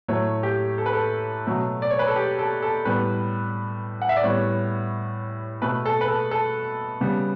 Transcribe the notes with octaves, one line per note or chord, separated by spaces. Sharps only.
A2 F#3 A3 C#5
G4
A4
B4
A4
B2 F#3 A3
D5
C#5
B4
A4
G4
A4
A4
A2 G3 B3 B4
F#5
E5
D5
A2 G3 B3 C#5
B2 A3 B4
A4
B4
A4
A4
C#3 G3 B3